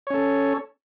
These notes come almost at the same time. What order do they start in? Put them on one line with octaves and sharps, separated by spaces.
C#5 C#4 A4